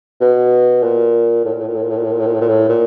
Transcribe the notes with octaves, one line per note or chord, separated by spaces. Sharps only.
B2
A#2
A2
A#2
A2
A#2
A2
A#2
A2
A#2
A2
A#2
A2
A#2
A2
A#2
A2
A#2